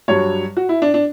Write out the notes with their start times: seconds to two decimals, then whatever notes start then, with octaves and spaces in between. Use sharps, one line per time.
0.08 G2 F#3 C#5
0.57 F#4
0.69 E4
0.82 D4
0.94 D4